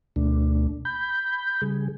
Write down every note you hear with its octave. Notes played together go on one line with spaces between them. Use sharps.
D2 B2 A3 D4
B5 G6
C#3 G3 G#4